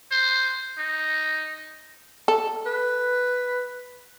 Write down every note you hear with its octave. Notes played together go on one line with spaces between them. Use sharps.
C5
D#4
A4
B4